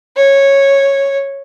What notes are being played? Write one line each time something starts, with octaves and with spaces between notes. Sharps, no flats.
C#5